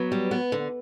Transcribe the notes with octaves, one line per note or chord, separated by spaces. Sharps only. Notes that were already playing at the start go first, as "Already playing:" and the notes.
Already playing: F#3 B3 B4
G3
B3
D3